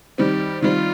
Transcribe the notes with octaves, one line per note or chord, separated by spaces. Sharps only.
D#3 G3 C4 G4
D#3 G3 C4 F4